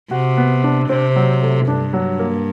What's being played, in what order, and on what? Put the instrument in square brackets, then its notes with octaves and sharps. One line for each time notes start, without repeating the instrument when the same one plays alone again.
[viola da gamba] C3 [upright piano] F#4
[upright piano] B3
D4
[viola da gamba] C3 [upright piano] C4
[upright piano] F#3
A3
[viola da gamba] G2 [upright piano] D4
[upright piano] F#3
A#3